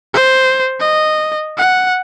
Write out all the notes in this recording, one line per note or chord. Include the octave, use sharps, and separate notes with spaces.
C5
D#5
F#5